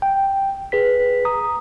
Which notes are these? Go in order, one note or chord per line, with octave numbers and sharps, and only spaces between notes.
G5
G#4 B4 B6
A#5 D#6